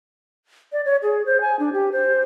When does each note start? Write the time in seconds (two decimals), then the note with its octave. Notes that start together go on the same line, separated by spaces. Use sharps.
0.72 D5
0.86 C#5
1.03 G#4
1.26 C5
1.41 G#5
1.59 D4
1.73 G4
1.92 C5